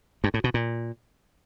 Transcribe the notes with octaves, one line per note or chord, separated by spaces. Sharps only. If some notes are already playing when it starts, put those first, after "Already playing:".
G2
A2
B2
A#2